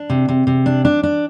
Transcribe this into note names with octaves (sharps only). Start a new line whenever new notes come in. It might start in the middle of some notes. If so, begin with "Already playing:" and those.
Already playing: D4
C3
C3
C3
D4
D4
D4